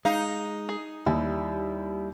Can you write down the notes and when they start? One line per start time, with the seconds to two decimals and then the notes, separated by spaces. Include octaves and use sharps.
0.05 G#3 D#4 F5
0.69 G#4
1.06 D#2 G3 E4